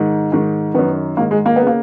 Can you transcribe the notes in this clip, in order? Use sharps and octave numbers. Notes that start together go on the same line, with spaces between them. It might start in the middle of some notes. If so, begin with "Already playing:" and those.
Already playing: G#2 D#3
G#2 D#3
F#2 D#3 B3
G#2 D#3 A#3
G#3
A#3
B3
C#3 A#3